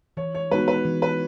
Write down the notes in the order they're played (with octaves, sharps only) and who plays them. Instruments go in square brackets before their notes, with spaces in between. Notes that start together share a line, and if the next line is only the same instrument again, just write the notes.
[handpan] E3 [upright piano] C#5
[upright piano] C#5
[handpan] G#3 B3 D#4 F#4 [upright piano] B4
[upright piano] B4
[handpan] E3
[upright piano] B4